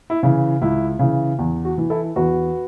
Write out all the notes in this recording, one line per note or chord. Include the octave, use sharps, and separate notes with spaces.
E4
C#3 E3
C#2 E4
C#3 E3
E2
F#4
E3
E4 A4
E2 F#4 B4